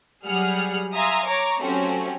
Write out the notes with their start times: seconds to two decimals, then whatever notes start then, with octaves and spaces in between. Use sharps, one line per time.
0.25 F#3 G3 G#4 F#5 F6
0.95 E5 F5 G#5 A#5 C6 D#6
1.27 C#5 A#5 C#6 D6
1.60 F#3 A3 C4 C#4 F#4 G4